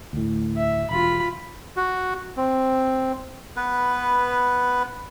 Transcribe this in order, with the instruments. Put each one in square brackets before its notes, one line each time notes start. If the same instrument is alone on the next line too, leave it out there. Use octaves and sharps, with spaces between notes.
[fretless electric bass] D2 A2
[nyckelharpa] E5
[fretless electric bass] E1 [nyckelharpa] F4 B5
[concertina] F#4
C4
[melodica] B3 B4